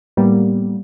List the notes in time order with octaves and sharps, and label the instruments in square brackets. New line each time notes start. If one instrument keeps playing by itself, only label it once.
[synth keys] A2 G3 A#3 B3